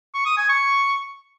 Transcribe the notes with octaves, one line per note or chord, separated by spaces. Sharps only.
C#6
D#6
G#5
C#6